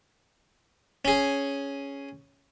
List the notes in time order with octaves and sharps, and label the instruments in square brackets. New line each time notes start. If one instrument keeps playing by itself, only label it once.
[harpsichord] C#4 G#4